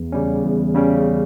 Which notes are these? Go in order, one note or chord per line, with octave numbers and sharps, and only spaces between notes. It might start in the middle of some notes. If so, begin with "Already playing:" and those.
Already playing: E2
C#3 G3 C#4
E2
C#3 G3 C#4